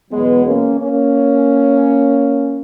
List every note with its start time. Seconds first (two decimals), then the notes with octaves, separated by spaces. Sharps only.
0.11 E2 B2 F#3 G#3 B3
0.46 A#3 C#4
0.81 A#3 C#4